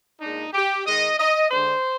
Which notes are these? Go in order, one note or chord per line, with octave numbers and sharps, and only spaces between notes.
A#2 G#3 D4 D#4
G4
D#3 G#3 D#4 D#5
D#5
D3 G#3 D4 C5